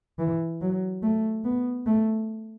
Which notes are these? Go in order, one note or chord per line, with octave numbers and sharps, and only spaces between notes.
E3
F#3
A3
B3
A3